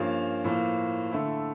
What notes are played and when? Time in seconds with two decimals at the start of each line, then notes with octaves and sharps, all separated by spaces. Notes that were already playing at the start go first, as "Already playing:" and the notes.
Already playing: G2 F3 A#3 C#4 F4 F5
0.44 A2 F3 A#3
1.11 D3 A3 E4